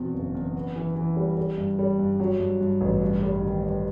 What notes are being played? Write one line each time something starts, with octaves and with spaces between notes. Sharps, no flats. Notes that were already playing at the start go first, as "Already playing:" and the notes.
Already playing: E2 B2 C4
F#1
E2
B3
E3
E3
G3
G3
G2
G3
G2
F#3
G2
G2
A1
G2
G3
D#3
G2